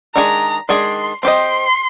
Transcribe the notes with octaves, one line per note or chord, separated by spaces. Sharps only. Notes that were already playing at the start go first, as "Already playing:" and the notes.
D#3 G#3 D4 G#4 A#5
D#3 G#3 D4 G#4 C6
C4 G4 C5 D#5 C6